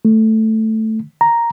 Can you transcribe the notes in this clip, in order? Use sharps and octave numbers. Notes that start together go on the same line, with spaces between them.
A3
A#5